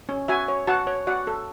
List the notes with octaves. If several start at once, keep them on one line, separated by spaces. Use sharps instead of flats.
C#4
F#4 E5 G#5
C#5
F#4 F#5 A5
C#5
F#4 D5 F#5
A4